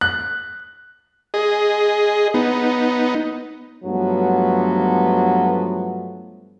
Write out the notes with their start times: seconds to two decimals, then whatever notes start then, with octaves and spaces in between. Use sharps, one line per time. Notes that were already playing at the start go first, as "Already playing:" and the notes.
0.01 F#6
1.34 G#4 D#5
2.34 B3 D#4
3.84 G2 F3 F#3 A3 B3